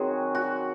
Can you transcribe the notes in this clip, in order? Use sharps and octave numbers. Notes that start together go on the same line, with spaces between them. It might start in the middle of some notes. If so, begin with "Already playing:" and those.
Already playing: D#3 F#3 C4 F#4 G#4
F#4